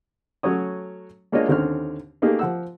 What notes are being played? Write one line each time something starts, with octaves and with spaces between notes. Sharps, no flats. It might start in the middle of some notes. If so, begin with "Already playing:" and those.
F#3 A3 C#4 D#6
G#3 A#3 D4 F4 C#5 D#5
D#2 D3 C4 C#4 F6
A3 A#3 D#4 G4 G#4 A#4
F3 F#5 E6